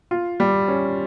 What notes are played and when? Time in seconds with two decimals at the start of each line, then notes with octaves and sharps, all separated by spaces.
0.11 F4
0.40 G3
0.68 C#4